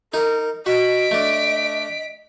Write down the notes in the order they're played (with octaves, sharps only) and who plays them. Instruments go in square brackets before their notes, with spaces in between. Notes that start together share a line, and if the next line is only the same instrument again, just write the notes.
[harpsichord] D#4 [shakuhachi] A#4
[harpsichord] F#4 [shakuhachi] D#5 [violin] B6 D7
[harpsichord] A3 D4